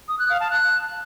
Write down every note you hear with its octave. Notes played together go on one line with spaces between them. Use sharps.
D#6
F#6
F5
A5
F#6